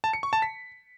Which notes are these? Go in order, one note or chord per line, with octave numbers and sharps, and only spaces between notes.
A5
C#7
C#6
A5
B6